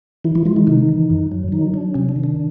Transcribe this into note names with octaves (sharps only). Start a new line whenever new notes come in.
E3 E4
E3 E4
F3 G#3 F4
E3 E4
C3 D#3 D#4
E3
F#2
F#3
D#3 F#3 D#4
F#3 D4
C3 C#4
D4
D#3
D4